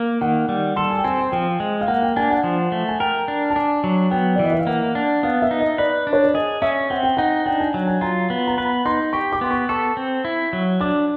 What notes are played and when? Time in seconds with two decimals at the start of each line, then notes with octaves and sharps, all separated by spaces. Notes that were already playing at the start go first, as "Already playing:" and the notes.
Already playing: A#3
0.21 D#3 F#5
0.49 G3
0.76 A4 C6
0.90 G#5
0.98 G5
1.04 C4 G#5
1.18 G5
1.32 F3 G5
1.60 G#3
1.81 F5
1.88 A#3 F#5
2.02 G5
2.16 D4 G#5
2.30 F#5
2.44 F3
2.72 A3
2.89 G#5
3.00 A#4 G5
3.28 D4
3.50 A5
3.56 D4 G#5
3.84 F#3
4.11 B3 G5
4.36 D5
4.39 E3 D#5
4.52 E5
4.59 F5
4.67 A#3 F#5
4.95 D4
5.23 B3 F5
5.42 E5
5.51 D#4
5.60 D#5
5.78 B4 D5
6.07 D4
6.13 C#5
6.24 D5
6.34 G#4 D#5
6.62 C#4 E5
6.90 C4 F#5
7.03 G5
7.17 D#4 F#5
7.46 D4 G5
7.61 G#5
7.74 F#3
7.87 G#5
8.01 F4 A#5
8.30 B3
8.47 A#5
8.57 B4 B5
8.85 D#4 C6
9.13 G4 C#6
9.33 D6
9.41 B3 C6
9.51 C#6
9.69 A4 C#6
9.97 C4
10.25 E4
10.53 F#3
10.81 D4 D6